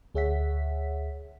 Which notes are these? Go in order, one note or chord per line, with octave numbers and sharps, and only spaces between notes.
D2 G#4 C#5 E5 F#5 B6